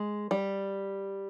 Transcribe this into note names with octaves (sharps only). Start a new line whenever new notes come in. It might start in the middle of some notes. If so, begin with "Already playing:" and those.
Already playing: G#3
G3